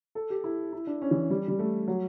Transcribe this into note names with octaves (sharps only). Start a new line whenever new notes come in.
A4
G4
E4
E4
D4
C#4
E3
G3
G3
A3
F#3